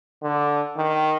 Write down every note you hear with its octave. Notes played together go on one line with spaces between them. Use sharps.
D3
D#3